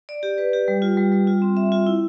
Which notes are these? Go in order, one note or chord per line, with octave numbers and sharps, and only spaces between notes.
D5
G4
B4
G4
G3
F4
G3
G3
F4
C4
E5
F4
E4